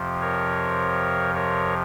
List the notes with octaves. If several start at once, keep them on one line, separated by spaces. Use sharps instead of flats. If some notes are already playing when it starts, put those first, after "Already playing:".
Already playing: F2 C3 F3
A#4 C#5
A#4 C#5